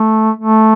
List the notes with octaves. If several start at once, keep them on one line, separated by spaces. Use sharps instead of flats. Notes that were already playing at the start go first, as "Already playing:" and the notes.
Already playing: A3
A3